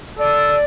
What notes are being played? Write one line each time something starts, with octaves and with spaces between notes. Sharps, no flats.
A4 D5